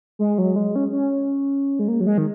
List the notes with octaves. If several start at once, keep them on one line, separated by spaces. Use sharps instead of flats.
G#3
F#3
G#3
C#4
C#4
G#3
A#3
F#3
G#3
D#3